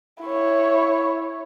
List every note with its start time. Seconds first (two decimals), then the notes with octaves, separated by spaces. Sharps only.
0.22 E4 C#5